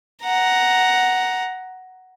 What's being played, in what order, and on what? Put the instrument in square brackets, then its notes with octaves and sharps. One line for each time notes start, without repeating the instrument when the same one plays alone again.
[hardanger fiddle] F#5 A#5